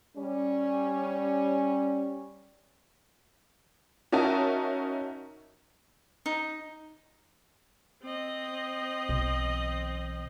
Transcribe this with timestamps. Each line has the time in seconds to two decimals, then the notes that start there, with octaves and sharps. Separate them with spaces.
0.17 G3 C#4
4.12 C#4 D#4 F#4 A#4 E5 A5
6.26 D#4
8.02 C4 D#5
9.09 B1 E3